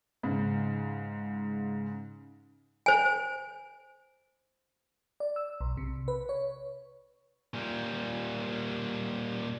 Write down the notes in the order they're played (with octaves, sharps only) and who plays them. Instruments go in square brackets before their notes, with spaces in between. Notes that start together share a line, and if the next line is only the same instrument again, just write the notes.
[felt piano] G#2 C#3
[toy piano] C5 G#5
[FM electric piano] D5
E6
B1
C3
B4
C#5
[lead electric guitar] A#2 G3